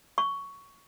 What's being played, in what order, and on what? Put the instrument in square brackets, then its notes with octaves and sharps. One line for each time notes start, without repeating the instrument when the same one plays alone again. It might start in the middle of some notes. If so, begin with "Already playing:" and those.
[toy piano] C#6